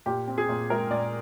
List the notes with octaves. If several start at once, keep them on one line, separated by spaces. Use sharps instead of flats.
A#2 G4
C4
G#4
A#2
G#3 A#4
A#2 D5